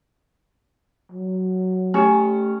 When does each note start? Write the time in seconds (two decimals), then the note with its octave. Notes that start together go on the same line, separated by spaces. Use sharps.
1.12 F#3
1.94 A3 C#4 G4